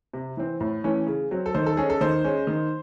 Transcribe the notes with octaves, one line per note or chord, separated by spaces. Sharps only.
C3
E3 C4
A2
E3 A3 C#4
C#3
F#3 C4
A4
D#3 C5
A4
G#3 C#4 G#4
A4
D#3 C5
G#3 C#4
D#3